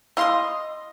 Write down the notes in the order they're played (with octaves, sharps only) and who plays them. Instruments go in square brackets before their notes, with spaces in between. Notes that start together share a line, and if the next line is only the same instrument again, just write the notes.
[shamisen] E4 F5 [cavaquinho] D#5 C6 D#6